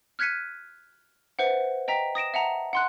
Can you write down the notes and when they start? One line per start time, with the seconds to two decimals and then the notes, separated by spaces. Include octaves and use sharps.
0.19 F6 F#6 G#6 B6 C#7 D#7
1.39 B4 C5 E5 F#5
1.88 D#5 G5 A#5 B6
2.15 D#6 A#6 D7 E7
2.34 E5 F#5 A5 A#5
2.73 F#5 C6 F#6